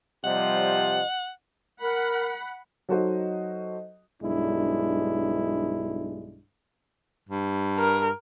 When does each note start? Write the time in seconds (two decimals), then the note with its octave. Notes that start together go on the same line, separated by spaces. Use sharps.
0.24 C3 F3 G3 D#5 F#5
1.81 A#4 F#5 B5
2.89 F#3 D#4 F#4 A4 C5 D#5
4.23 B1 G2 G#3 D4 E4
7.29 G2
7.79 A#4